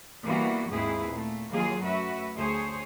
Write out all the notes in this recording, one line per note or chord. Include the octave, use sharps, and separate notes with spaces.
E3 G3 A#3 B3 F#4
D#2 G#2 C4 E4 G#4 B4
A#2 A3
D#2 F#3 A#3 F4 G#4
F#2 A3 F#4 B4 E5
D2 G#4 C5 C#5